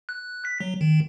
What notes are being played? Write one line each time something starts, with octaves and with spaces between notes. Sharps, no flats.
F#6
B6
F#3
D#3